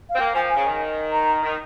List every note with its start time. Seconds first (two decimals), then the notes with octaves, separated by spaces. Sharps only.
0.10 F5
0.15 C4
0.20 A#3 G5
0.35 F3 G#5
0.51 G#5
0.56 C#3
0.67 D#3
1.13 A#5
1.43 D#3